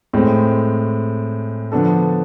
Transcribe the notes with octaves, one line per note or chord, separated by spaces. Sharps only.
A2 G#3 C4
D3 F3 B3 D4 A4